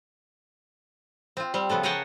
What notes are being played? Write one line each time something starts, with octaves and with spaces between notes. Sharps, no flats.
C4 F4
G3 C4
C#3 F3 B3 A4
G#4 A#4 C#5 F#5 G5 A5